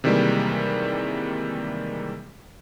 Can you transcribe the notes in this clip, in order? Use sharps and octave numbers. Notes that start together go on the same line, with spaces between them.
C3 D#3 E3 G3 G#3 A#3